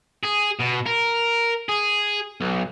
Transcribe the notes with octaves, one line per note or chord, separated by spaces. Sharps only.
G#4
B2
A#4
G#4
B1